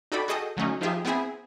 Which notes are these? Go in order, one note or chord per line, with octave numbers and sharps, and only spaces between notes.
D#4 F#4 A4 D5 G5 B5
F#4 G#4 A4 D#5 G5 D#6
D3 F#3 A3 C#4 D#4
F3 D#4 F4 G4 G#4 E5
B3 C4 E4 G#4 E5 G#5